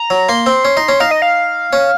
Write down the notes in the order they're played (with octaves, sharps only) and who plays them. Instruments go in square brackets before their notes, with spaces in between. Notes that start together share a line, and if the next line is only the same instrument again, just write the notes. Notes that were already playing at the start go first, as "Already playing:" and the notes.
Already playing: [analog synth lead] A#5
[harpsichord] F#3
[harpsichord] A#3 [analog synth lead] C6
[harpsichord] C4
C#4
D#4
C#4
[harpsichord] D#4 [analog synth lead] F5
[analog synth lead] D#5
F5
[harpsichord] C#4